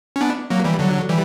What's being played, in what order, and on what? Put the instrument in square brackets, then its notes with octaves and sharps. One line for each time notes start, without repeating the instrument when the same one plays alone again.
[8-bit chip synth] C#4
B3 D4
F#3 A#3
E3 G3
D3 F#3
E3 G3